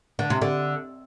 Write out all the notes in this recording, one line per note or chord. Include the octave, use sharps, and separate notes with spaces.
D3
C3
D3